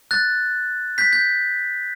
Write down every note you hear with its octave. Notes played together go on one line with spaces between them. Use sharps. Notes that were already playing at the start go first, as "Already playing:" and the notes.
F#6 A6
G6 B6
G6